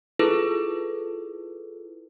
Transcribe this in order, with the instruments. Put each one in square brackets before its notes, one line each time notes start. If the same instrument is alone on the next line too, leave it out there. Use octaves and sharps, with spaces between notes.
[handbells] E4 F4 G#4 A4 B4